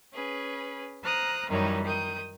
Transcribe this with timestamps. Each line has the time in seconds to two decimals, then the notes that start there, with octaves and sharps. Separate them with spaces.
0.12 C#4 G#4 B4
1.03 C5 A#5 D#6 F6 F#6
1.49 F#2 D#3 E3 G3 D#4 C#5
1.84 D#3 D#6 G6